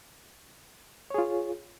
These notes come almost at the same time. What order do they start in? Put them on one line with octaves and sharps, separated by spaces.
C#5 G#4 F4